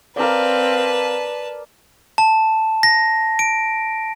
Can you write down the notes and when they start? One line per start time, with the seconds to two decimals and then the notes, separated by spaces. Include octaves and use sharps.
0.16 C4 A#4 B4 D5 F5 A5
2.18 A5
2.83 A#6
3.39 D7